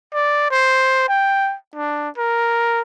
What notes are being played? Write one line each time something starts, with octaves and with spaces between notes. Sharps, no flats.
D5
C5
G5
D4
A#4